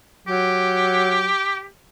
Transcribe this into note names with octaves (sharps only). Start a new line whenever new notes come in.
F#3 G4